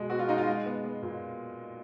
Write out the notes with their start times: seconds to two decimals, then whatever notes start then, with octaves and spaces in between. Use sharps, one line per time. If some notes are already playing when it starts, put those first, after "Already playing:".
Already playing: B2 G#3
0.10 B3 F#4
0.19 F4
0.28 G#3 D#4
0.38 F4
0.46 G#3
0.66 B3
0.84 B3
1.02 A#2